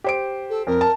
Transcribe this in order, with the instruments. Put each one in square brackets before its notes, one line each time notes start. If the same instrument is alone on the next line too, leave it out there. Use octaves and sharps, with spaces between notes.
[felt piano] G4 C5 D7
[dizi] A4
[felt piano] F2 [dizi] A#4
[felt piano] A5